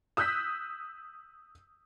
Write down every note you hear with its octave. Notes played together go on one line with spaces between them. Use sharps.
D#6 E6 F#6 G6 B6